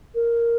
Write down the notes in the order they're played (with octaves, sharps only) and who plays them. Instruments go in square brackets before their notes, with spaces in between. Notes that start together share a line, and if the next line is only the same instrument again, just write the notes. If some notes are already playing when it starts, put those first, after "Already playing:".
[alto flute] A#4